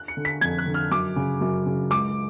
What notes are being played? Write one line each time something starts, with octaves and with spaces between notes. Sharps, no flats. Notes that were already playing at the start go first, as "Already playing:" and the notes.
Already playing: F#6
C#7
D3
B6
F2 G#6
F#6
D3
F6
F#2 D6
C#3
F#2
C#3
C#2 D6